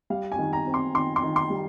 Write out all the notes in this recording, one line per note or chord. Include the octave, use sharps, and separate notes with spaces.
G3 F5
G#5
D#3
A#5
C4
C6
D#3 C6
C6
D#3
C6
G3